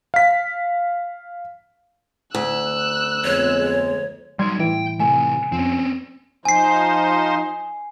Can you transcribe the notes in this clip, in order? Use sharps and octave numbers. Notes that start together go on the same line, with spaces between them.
F5 B6
D2 E6 F#6
F2 G#3 B3 C#5
F#3 G3 D#4 C6 G#6
A2 E3 G5
C3 A3 G#5
F2 C4 C#4
F3 D#4 C5 G#5 C7